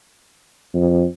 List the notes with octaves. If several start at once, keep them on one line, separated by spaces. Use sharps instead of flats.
F2